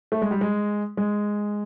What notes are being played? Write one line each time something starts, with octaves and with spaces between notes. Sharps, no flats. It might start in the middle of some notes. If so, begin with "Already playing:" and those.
A3
G#3
G3
G#3
G#3